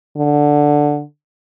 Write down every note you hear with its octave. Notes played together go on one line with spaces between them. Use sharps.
D3